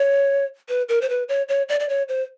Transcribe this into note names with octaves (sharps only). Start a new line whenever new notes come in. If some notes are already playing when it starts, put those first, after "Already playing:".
Already playing: C#5
B4
A#4
C5
B4
C#5
C#5
D5
D5
C#5
C5